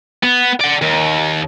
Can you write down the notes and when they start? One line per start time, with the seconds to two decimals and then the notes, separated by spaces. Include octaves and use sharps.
0.23 B3
0.60 D5 F#5
0.82 D#2